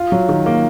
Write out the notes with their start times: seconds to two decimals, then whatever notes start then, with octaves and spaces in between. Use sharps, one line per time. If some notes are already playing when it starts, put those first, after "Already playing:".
Already playing: F4
0.12 F#3
0.29 D#3
0.46 A#3